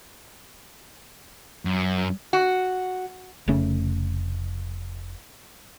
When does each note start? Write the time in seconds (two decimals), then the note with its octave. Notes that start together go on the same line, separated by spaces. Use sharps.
1.65 F#2
2.33 F#4
3.48 F1 C#3 A3 C#4